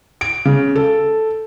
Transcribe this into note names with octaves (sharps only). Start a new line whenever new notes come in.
D7
C#3
A4